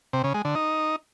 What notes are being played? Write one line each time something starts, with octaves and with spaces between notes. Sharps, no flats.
C3
C#3
G#3
D3
D#4